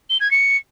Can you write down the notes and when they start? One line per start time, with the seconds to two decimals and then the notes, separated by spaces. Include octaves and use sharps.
0.10 G7
0.20 G#6
0.31 C#7